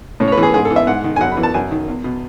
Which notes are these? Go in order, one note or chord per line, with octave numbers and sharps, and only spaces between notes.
A2 C#4
C#5
B4
E3
G#4
G#2 G#4
A4
E3
E5
G#2 F#5
D#3
G#5
F#2 F#5
B5
E3
A5
F#2 G#5
D#3
E2
B2